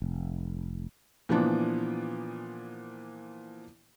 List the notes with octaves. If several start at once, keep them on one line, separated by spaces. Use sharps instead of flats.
F1
A#2 E3 F3 B3 D4